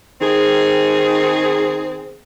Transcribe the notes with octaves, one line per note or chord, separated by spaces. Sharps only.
D#3 C4 G#4